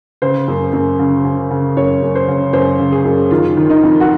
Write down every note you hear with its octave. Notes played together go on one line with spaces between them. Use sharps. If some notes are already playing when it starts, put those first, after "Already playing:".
C#3 C5
F#2
F#2
C#3
C#3
C#3
F#2 C#5
F#2
C5
C#3
F#2 C5
C#3
G#4
F#2
D#3 F4
D#3
D#4
F2
F#4